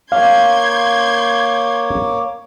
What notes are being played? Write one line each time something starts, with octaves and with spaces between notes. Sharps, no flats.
A#3 C#5 F5 C6 D6 G6 G#6